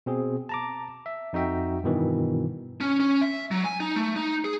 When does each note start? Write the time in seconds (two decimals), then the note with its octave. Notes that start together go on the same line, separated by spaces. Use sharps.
0.06 B2 C4 G#4
0.49 A5 A#5 D6
1.06 E5
1.33 F2 D#4 F#4 E5 G5
1.84 G2 B2 D#3 E3
2.81 C#4
3.00 C#4
3.21 E5
3.51 F#3
3.65 G#5
3.80 D#4
3.96 A3
4.16 D#4
4.45 G#4